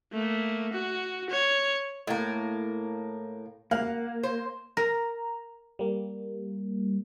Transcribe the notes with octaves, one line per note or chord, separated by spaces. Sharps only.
A3 A#3
F#4
C#5
A2 A#3
A#3 F5 F#5
C5
A#4 A#5
G3 A#3